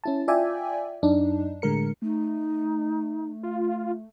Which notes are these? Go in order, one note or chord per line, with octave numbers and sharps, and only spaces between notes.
C#4 E4 A5
F4 D5 E5 G5 G#5
F#2 D4 D#4
A2 D3 G#3 A#4 C#7
A3 D#4
F4